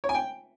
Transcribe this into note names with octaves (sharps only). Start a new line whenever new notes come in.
C#5
G#5
G5